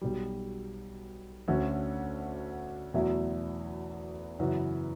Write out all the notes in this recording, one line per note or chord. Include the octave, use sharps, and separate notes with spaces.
B1 B2 G3
D2 D3 A3 C#4 F#4
E2 B2 F#3 A3 E4
F#2 C#3 E3 B3 F#4